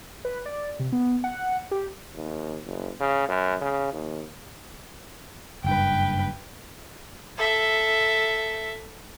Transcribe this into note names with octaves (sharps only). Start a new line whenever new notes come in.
B4
D5
C3
B3
F#5
G4
D#2
F#1
C#3
F#2
C#3
D#2
F#1 G2 B4 G5
A4 E5